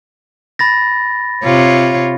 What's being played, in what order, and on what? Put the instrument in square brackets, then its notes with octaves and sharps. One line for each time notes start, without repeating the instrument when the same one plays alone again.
[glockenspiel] B5 A6 A#6
[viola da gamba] C3 F4 C#5